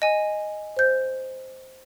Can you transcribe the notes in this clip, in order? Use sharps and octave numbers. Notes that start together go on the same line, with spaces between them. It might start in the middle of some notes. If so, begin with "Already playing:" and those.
D#5 G#5
C5 G6